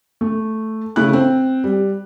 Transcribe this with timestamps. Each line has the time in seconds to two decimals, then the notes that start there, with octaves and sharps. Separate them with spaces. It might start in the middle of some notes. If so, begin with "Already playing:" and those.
0.21 A3
0.96 C#3 A3 E4 F#6
1.13 C4
1.64 G3